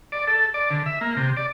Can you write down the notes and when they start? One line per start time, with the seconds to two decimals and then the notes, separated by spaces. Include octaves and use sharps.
0.12 D5
0.27 A4
0.54 D5
0.71 D3
0.86 E5
1.01 A#3
1.17 C3
1.37 D5